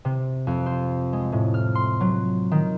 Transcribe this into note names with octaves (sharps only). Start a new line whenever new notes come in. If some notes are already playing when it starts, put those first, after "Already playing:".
C3
F2
C5
G#3
A2
F6
C6
F#3
D#3